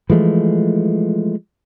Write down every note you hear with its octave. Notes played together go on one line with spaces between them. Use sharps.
E3 F3 G#3 A3